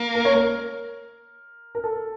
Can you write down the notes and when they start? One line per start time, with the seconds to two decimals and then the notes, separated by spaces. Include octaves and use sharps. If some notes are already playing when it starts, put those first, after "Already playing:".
Already playing: A#3
0.15 A#4
0.25 C#5
0.35 A#4
1.75 A#4
1.84 A4